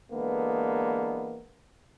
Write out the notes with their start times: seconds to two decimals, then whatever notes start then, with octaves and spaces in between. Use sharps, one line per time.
0.12 D3 E3 G#3 A#3 B3